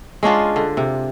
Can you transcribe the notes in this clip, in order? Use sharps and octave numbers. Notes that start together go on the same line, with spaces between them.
G#3 C#4 D4 F4
D3
C3